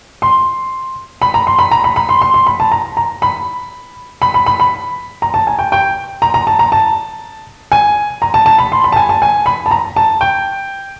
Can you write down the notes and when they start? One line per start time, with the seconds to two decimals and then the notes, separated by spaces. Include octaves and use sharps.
0.22 C6
1.22 B5
1.34 A#5
1.47 C6
1.59 B5
1.71 A#5
1.84 B5
1.96 B5
2.09 C6
2.21 C6
2.34 C6
2.47 B5
2.60 A5
2.72 A#5
2.97 A#5
3.22 B5
4.22 B5
4.34 B5
4.46 B5
4.60 B5
5.22 A#5
5.34 A5
5.47 G#5
5.59 G5
5.72 G5
6.22 A#5
6.34 A#5
6.47 A5
6.59 A#5
6.72 A5
7.72 G#5
8.22 A#5
8.34 A5
8.46 A5
8.58 B5
8.72 C6
8.84 B5
8.92 A5
8.96 G#5
9.09 A5
9.22 G#5
9.46 B5
9.66 A5
9.71 A#5
9.96 A5
10.21 G5